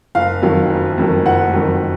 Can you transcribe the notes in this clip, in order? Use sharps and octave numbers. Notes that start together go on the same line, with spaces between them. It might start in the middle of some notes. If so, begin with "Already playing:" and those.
F#1 F5
F2 D#3 F#3
F#1
F2 D#3 F#3
F#1 F#5
F2 D#3 F#3